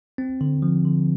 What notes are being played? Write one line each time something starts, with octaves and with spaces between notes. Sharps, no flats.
C4
D3
F3
D3